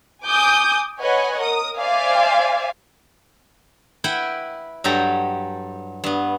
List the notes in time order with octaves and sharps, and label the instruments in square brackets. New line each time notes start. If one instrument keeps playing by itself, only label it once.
[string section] G#5 D6 D#6 G6
B4 C#5 D#5 F#5 G#5
A#4 D#6
C5 D5 E5 F5 G#5
[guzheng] E4 B4 E5 F#5 G5
G2 F#3 G4 A4 A#5
G2 B3